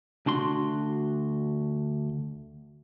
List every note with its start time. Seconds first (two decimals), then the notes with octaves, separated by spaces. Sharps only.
0.26 D2 D4 F#4 C6